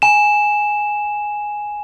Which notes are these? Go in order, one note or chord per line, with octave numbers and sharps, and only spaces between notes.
G#5 E7